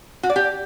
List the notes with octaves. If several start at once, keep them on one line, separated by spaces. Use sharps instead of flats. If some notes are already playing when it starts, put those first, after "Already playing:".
F#4
D5
G4